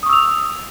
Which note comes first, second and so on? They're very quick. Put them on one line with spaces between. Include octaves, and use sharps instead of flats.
D#6 C#6 E6 F7